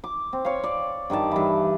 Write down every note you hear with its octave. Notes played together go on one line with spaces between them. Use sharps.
D6
C4
C#5 F5
D5
G2 D#3 D5 A5
G2 E3